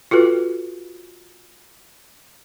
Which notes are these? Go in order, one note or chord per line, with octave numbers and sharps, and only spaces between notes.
F4 F#4 A4 B4